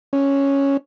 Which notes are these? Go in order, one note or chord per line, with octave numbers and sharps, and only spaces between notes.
C#4